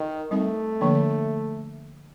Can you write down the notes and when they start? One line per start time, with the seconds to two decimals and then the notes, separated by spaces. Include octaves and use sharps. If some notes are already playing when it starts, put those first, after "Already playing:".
Already playing: D#3
0.31 G3 A3 C4 D#4
0.81 D3 F3 A#3 D4